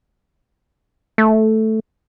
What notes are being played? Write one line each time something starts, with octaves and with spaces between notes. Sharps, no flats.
A3